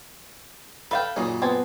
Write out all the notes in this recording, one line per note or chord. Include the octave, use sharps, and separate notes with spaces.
A4 B4 E5 F5 G5
F#2 A#2 C#3 D#4 G#4
B3 C4 G#5 A5